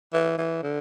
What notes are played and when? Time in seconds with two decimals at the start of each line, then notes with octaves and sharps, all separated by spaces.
0.13 E3
0.38 E3
0.63 D3